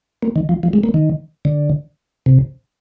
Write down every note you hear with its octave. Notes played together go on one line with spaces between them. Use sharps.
A#3
D#3
F3
F3
G#3
A#3
D#3
D3
C3